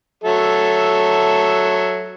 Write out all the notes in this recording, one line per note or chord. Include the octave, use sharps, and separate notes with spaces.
F#3 A4 E5